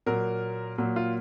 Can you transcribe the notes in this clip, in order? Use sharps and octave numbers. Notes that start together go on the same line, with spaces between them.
A#2 F#3 A#3 A#4
A#2 F#3 A#3
F4